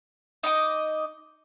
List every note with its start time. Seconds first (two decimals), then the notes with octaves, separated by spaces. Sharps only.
0.43 D#4 D#5 D6